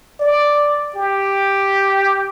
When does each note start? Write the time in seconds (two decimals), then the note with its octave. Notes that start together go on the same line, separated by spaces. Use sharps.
0.20 D5
0.96 G4